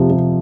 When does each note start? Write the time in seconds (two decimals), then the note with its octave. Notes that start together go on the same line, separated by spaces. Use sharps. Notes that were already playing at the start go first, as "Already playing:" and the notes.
Already playing: F2 C3 F3
0.10 C3